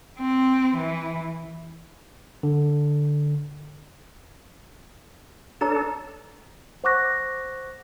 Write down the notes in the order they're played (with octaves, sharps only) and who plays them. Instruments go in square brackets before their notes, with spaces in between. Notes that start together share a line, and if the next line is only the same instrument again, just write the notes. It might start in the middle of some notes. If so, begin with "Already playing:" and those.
[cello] C4
E3
[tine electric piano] D3
[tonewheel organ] D4 A4 [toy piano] B4 C#5 A#5
[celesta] C5 F#5 C#6 D6 F#6 A#6